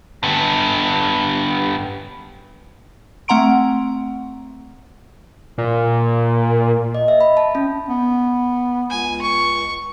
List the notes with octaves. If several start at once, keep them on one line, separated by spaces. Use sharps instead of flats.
G2 B3
A3 C4 F#5 A#5 C6 D7
A#2
D#5
E5
B5
A5
C#4
B3
C#2 G#5
C#6